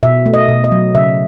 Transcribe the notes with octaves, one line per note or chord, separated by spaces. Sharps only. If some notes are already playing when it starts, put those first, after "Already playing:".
B2 E5
A3
D#5
B2
D#5
F#3
C#3 E5